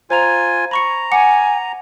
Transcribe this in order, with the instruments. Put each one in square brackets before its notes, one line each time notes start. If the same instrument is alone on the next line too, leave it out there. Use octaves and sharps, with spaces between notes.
[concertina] F4 G#5 [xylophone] C5 A#5 F7
[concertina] A#5 [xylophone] B5 C#6 C#7
[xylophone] F#5 D6 C#7 [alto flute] G#5